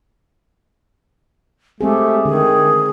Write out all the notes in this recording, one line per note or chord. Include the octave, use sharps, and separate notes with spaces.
G#3 A3 C4 G4 G#4
D3 D#3 G#4